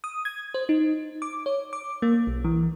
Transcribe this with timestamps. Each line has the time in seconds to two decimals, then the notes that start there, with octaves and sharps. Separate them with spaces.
0.04 D#6
0.25 G#6
0.54 C5
0.69 D#4
1.22 D6
1.46 C#5
1.73 D6
2.02 A#3
2.27 B1
2.45 E3